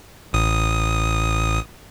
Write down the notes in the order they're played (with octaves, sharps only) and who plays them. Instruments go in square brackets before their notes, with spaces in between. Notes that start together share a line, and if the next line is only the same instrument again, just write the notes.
[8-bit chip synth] A1 D#6